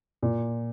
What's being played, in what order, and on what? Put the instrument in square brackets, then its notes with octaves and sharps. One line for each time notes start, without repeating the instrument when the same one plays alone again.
[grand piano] A#2